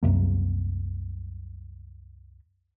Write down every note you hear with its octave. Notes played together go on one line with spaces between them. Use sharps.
C2 F#2 C3 A#3